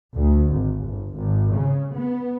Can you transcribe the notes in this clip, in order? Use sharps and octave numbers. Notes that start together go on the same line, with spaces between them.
D2
G#1
G1
G#1
C#3
B3